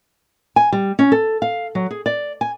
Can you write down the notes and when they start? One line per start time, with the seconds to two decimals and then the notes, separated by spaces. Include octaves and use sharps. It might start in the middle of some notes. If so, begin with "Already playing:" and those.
0.56 G#5
0.72 G3
0.99 C#4
1.12 A4
1.42 F5
1.75 F#3
1.91 G#4
2.06 D5
2.41 G#5